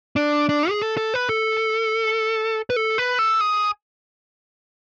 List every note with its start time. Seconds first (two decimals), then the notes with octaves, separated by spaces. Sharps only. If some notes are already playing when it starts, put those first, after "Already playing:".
0.16 D4
0.49 D4
0.70 G#4
0.82 A4
0.97 A4
1.14 B4
1.29 A4
2.70 B4
2.76 A4
2.98 B4
3.19 A4
3.41 G#4